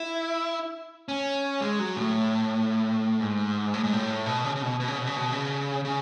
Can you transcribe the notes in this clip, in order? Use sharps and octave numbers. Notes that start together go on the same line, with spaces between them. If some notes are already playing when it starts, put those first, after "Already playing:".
Already playing: E4
C#4
G#3
F#3
A2
G#2
A2
G#2
A2
B2
C#3
C#3
B2
B2
C#3
B2
C#3
B2
C#3
C#3